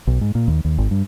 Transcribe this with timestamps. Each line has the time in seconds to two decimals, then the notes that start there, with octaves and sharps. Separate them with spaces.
0.07 B1
0.21 G#2
0.35 A#2
0.48 D#2
0.65 D#2
0.78 G#1
0.91 G2